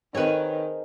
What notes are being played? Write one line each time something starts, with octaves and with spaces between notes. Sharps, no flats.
D#3 C4 G#4 A#4 B4 C#5